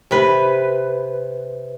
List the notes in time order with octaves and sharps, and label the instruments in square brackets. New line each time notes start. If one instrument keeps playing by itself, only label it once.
[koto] C3 B4